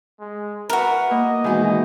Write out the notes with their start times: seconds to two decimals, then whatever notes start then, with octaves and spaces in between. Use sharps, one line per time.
0.20 G#3
0.70 E4 F#4 A#4 B4
1.11 A#3 D#5
1.44 B2 D#3 E3 G#3